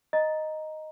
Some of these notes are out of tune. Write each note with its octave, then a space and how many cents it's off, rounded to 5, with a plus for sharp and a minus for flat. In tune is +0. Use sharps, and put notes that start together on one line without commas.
D#5 +0 A#5 +5